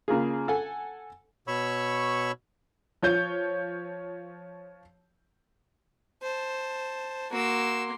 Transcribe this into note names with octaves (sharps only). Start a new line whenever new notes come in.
C#3 A#3 F4 G#4
A4 F#5 G#5
B2 C#5 B5 C#6 E6
F3 C#5 G6
C5 A5
A#3 F#4 C6 E6